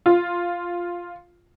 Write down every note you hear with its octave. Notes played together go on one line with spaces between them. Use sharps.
F4